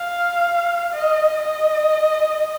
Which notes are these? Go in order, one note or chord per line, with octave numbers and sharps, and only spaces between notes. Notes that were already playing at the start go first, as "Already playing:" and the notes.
Already playing: F5
D#5
D#5